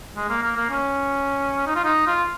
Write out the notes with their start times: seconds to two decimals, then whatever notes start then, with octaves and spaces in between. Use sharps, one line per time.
0.16 G#3
0.29 A#3
0.43 A#3
0.57 A#3
0.70 C#4
1.67 D#4
1.76 F4
1.84 D#4
2.07 F4